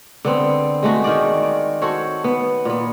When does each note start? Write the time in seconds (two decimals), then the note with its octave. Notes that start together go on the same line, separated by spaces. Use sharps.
0.25 D3 B3 C4
0.83 G#3 A3 F#4
1.04 D#3 D5
1.82 F#4 A4 C5 C#5
2.24 B3
2.65 A#2 B3